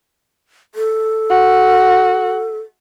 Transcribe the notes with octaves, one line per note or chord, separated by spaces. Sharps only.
A4
F#4